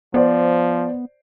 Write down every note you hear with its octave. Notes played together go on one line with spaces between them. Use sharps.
F3 B3 C5 D5